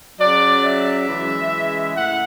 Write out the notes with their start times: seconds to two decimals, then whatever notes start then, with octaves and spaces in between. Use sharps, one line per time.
0.19 C#3 F#3 D5
0.63 E5
1.07 C#3 E3 G#3
1.95 A2 F#5